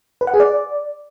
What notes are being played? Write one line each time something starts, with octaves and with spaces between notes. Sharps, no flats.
B4
F#5
G#4
D5